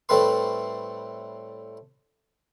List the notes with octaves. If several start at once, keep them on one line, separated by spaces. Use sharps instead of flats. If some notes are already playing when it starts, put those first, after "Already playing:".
A2 G3 A3 C4 B4 C6